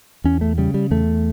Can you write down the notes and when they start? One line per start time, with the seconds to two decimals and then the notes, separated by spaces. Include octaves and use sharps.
0.24 E2 C#4
0.41 A3
0.58 C#3 G3
0.74 G3
0.91 E2 A3